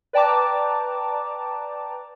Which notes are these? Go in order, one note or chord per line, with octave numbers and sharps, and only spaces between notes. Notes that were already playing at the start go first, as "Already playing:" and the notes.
B4 D5 G5 A5 A#5 D6